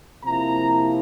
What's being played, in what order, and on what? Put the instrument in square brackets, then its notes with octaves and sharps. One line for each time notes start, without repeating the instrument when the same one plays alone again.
[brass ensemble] C3 F3 A#3 E4 A#5